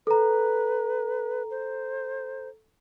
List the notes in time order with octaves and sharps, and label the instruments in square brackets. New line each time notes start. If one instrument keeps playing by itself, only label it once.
[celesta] A4 A#5 [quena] B4
[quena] C5